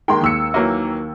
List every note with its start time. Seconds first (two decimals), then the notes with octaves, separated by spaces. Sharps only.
0.08 D#3 G#3 A#3 G5 C6
0.21 D#2 E6 C#7
0.54 E3 F#3 A#3